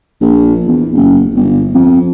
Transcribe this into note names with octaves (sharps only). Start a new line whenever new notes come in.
A#1
E2
F#1
G1
F2